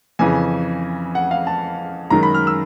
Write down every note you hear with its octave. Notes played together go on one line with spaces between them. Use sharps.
F2 C#3 E3 G#5
F#5
F5
A5
F#2 D#3 G#3 A#5
B5
F6
E6